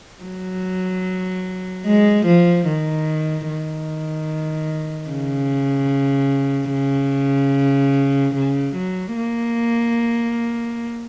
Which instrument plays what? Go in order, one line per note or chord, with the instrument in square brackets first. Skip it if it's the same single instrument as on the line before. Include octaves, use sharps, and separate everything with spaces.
[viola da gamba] F#3
G#3
F3
D#3
D#3
C#3
C#3
C#3
F#3
A#3